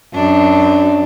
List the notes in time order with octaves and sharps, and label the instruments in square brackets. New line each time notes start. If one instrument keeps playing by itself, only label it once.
[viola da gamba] F#2 D4